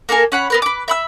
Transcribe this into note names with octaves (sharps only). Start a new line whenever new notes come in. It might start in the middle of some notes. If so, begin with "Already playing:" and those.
A#3 A4 A#4 G#5
C#4 F#5 B5
B3 A#4 B4
B4 D6
E5 B5 E6